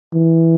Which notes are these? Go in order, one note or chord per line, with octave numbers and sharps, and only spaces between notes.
E3